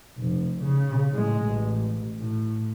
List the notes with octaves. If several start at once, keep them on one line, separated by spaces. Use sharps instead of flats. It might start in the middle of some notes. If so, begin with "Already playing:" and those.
F1
C#3
A2 G#3
A1
A2